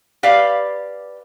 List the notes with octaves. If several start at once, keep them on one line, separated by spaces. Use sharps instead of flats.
G4 B4 D5 F5